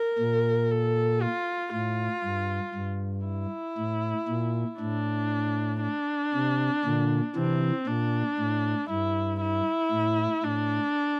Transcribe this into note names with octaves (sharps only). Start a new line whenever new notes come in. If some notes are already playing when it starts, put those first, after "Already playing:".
Already playing: A#4
A#2
A4
F4
A2 F4
G2
G2
E4
A2
A#2
A2 D4
D4
C3
A#2 D3
C3 E3 C4
A#2 D4
A2
G2 E4
E4
A2
A2 D4